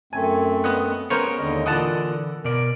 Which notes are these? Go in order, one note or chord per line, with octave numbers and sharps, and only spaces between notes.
F#2 A3 C4 G#5
B3 D#5 F#5
G#3 B3 C#4 A#4 C5 C#5
D#2 D3 D#5
A#2 D3 E3 D#5 F#5 A5
B2 A#4 D5